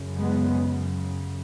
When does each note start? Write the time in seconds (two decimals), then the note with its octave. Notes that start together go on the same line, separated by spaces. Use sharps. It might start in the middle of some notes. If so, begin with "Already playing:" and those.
Already playing: F#2 C#3
0.19 G#3 B3